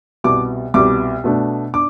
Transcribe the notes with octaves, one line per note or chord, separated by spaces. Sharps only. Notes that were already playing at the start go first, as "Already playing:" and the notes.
C2 B2 G3 D6
C2 B2 G3 D6
B2 A3 D4
D4 D6